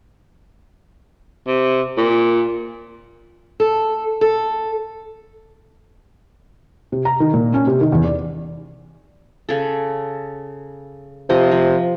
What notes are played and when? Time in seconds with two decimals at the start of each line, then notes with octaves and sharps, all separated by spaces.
1.47 C3
1.97 A#2
3.60 A4
4.21 A4
6.92 C3
7.05 A#5
7.20 D#3
7.34 A#2
7.54 C#4
7.67 C3
7.81 D#3
7.92 E2
8.05 D5
9.49 C#3 A4
11.30 C3 F3 D#5
11.51 F3